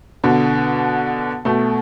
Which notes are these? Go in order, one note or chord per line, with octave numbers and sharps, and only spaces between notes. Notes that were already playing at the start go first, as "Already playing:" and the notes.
B2 D3
B2 A3